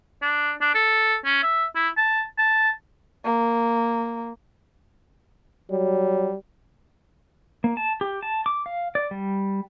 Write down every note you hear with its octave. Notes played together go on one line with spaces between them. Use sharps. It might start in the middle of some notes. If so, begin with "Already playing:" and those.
D4
D4
A4
C#4
E5
E4
A5
A5
A#3
F#3 G3
A#3
A5
G4
A5
D6
F5
D5
G3